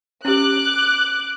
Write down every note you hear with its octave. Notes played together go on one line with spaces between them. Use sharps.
C#4 G4 D6 F#6